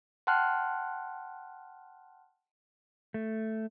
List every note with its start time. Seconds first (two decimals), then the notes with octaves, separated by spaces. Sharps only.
0.27 F#5 G5 A5 C6 F6 F#6
3.14 A3